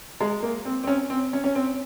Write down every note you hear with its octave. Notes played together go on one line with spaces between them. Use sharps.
G#3
A#3
C4
C4
C#4
C4
C#4
C#4
C4